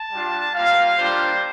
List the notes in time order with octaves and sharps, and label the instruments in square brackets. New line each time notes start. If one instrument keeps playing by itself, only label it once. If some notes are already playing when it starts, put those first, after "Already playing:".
Already playing: [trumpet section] A5
G3 D4 F4
G3 A#3 F4 F5
G3 A#3 D4 F4 C5